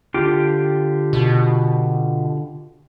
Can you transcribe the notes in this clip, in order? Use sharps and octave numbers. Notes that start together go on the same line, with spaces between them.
D3 F4 G4
B2